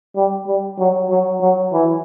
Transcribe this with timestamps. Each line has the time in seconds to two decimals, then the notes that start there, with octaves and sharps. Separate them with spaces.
0.16 G3
0.47 G3
0.79 F#3
1.10 F#3
1.41 F#3
1.73 E3